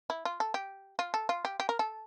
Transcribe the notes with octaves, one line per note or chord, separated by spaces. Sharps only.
E4
F4
A4
G4
F4
A4
F4
G4
G4
A#4
A4